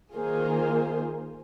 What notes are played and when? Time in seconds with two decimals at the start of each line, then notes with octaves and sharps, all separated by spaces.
0.14 D#3 A#3 F4 G#4 C5